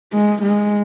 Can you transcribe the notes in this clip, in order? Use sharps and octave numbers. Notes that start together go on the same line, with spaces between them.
G#3
G#3